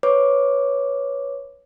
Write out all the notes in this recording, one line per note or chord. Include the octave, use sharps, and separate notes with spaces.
B4 C#5 D6